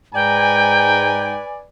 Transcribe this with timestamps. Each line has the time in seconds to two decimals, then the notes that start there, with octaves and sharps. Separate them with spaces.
0.15 G#2 B4 D5 G5 G#5 A#5